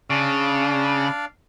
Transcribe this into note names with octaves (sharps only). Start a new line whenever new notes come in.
C#3 D4 D5 F5